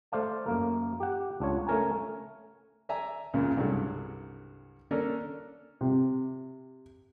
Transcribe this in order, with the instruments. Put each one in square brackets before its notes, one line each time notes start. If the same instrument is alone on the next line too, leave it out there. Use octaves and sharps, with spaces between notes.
[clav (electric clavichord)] A3 C5 D5 F5 A5
F#2 A#3 A#4
G4 F#5
C#2 D4 F4 C#5
A3 C#4 A#4 G#5 A#5
[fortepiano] D5 E5 G#5 A#5
C#2 F#2 A#2 C#3
C2 G2 F#3 G#3 A3
A#3 C#4 D4 A4 A#4
C3